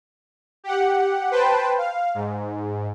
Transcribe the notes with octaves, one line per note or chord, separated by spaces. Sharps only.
G4 F#5
B4 C5 G5 A5
F5
G#2